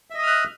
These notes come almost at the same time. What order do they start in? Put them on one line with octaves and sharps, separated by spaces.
E5 D#5 D#6 F6 F#6